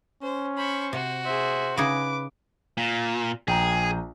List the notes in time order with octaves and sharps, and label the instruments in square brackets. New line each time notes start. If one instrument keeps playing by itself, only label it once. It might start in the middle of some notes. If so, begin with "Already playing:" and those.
[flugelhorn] C#4 [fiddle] C5
[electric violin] C5 [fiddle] B5 C#6
[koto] C3 [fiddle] F#4
[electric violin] G#4 E5 [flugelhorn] C5
[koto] C#3 D#4 G#4 [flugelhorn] B4 [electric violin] D6
[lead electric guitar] A#2
[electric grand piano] A#1 G5 A#5 [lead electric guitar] G#4